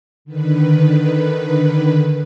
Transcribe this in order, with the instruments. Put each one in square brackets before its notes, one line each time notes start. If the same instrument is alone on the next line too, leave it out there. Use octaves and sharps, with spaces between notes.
[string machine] D3 D#3 B4